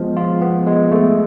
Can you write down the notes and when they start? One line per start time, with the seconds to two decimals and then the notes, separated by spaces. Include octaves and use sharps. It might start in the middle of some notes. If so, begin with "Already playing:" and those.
Already playing: F3 G#3 B3
0.17 F4
0.41 B3
0.67 G#3
0.92 A3